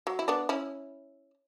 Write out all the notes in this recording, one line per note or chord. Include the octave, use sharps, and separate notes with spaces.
F#3
E4
B3 D4
C#4 E4